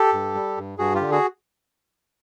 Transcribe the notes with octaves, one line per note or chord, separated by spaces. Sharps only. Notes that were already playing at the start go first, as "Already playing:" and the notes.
Already playing: G4 A4
G2
G3
G2
G2 F#4 G#4
F4 G4
D3
F#4 G#4